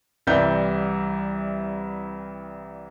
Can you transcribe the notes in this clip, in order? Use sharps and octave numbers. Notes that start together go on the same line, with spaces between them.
C2 E3 G3 E4 G6